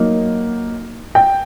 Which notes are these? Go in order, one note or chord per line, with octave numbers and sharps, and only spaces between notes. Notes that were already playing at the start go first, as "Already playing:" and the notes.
Already playing: F#3 A#3 D#4
G5